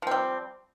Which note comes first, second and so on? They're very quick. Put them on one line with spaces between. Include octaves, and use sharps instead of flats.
F3 C4 G3